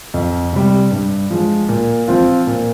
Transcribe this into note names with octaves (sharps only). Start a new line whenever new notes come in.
F2
C3 G3
G2
F3 G#3
A#2
F3 C4 F4
A#2